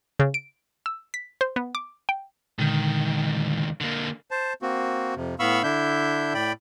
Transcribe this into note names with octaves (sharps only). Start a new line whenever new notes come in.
C#3
D7
E6
B6
C5
B3
D6
G5
C#2 A#2 D3 D#3 G#3
D3 A#3
C5 A5
A#3 C4 F#4
F2 C3
A2 B3 F5 B5 C#6 E6
D3 D4 E4 E5 G6
A2 D5 G5 B5